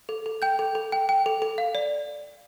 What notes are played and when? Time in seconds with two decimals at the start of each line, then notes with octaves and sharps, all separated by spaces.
0.09 A4
0.26 A4
0.42 G5 G6
0.59 A4
0.75 A4
0.92 G5
1.09 G5
1.26 A4
1.42 A4
1.58 F5
1.75 D5